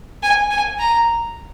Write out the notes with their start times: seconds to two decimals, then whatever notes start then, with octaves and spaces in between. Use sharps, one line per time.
0.23 G#5
0.51 G#5
0.79 A#5